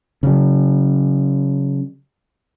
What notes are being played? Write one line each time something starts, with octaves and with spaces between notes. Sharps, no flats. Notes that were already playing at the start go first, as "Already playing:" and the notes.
C#3 F#3